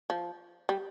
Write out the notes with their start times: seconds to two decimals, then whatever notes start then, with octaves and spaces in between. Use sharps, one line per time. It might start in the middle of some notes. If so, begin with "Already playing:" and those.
0.10 F3
0.69 G3